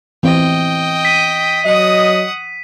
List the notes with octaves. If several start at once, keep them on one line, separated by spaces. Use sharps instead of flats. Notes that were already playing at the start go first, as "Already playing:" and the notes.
E3 C4 C5 D#5 G5
B6 D#7
F#3 D#5 F#5 D#6